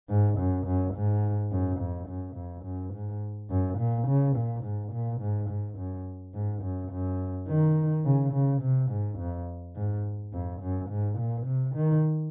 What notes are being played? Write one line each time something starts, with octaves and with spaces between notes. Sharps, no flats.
G#2
F#2
F#2
G#2
F#2
F2
F#2
F2
F#2
G#2
F#2
A#2
C#3
A#2
G#2
A#2
G#2
G#2
F#2
G#2
F#2
F#2
D#3
C#3
C#3
C3
G#2
F2
G#2
F2
F#2
G#2
A#2
C3
D#3